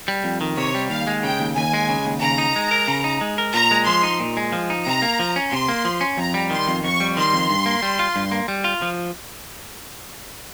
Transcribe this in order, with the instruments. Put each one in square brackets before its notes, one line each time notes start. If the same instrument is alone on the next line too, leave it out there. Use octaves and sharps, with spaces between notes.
[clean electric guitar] G3
F2
D#3
[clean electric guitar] C3 [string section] C#5
[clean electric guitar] G3
[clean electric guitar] D#2 [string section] F5
[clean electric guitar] G#3
[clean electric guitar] C#3 [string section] G5
[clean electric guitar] D#2
[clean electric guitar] D#2 [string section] G#5
[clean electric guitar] G#3
C#3
D#2
[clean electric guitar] C#3 [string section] A#5
[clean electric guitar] D#4
G#3
A#4
C#3
D#4
G#3
A#4
[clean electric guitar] A#2 [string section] A#5
[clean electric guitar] G#3
[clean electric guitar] F3 [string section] C6
[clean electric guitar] D#4
A#2
G#3
F3
D#4
[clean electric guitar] C3 [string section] A#5
[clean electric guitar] A#3
F3
C#4
[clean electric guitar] C3 [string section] C6
[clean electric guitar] A#3
F3
C#4
[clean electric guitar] F2 [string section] A#5
[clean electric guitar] G3
[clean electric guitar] D#3 [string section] C6
[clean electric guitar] F2
[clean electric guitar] F2 [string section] C#6
[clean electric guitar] G3
[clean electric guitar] D#3 [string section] C6
[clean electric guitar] F2
G2
A#3
G3
F4
G2
A#3
G3
F4
F3